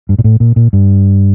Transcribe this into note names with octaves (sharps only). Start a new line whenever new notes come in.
G2
A#2
A2
A#2
A#2
G2